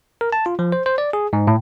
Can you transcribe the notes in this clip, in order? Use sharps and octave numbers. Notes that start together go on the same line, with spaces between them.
A#4
A5
F4
F3
C5
C5
D5
G#4
G#2
A2